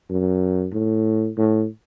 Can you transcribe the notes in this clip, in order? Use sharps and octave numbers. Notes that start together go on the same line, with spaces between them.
F#2
A2
A2